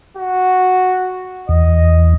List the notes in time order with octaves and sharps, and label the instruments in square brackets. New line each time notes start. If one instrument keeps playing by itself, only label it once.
[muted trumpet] F#4
[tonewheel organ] E2 [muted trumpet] D#5